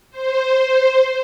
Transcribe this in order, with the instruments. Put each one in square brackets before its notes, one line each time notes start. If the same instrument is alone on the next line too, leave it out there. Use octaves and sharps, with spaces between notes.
[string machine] C5